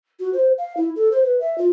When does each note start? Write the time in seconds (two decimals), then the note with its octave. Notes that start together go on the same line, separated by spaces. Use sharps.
0.19 F#4
0.33 C5
0.58 F5
0.77 E4
0.96 A4
1.12 C5
1.24 B4
1.40 E5
1.58 F4